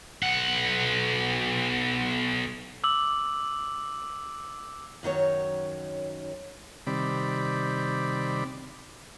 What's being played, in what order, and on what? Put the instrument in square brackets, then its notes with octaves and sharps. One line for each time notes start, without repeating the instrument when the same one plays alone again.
[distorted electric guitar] B1 F#5
[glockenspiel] D6 E6 F#7
[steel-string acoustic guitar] F#2 D#3 F#3 C#5
[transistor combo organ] C3 D#3 G3 C4 D5 B5